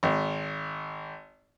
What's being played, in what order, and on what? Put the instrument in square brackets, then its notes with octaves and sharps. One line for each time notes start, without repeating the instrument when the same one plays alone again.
[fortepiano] G#1